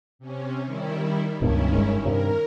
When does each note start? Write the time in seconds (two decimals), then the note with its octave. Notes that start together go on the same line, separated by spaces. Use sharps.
0.19 C3 C#4
0.65 D#3 G3 E4
1.42 C#2 G2 B2 D#3 C#4 E4
1.75 F#1 G2 G#3
2.05 G2 C3 A#4